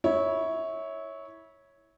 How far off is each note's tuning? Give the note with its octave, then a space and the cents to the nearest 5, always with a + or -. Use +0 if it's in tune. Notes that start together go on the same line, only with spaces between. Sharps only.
E4 -25 C#5 +0